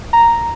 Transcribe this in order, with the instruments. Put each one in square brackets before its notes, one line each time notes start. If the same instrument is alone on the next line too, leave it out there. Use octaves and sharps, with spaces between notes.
[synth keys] A#5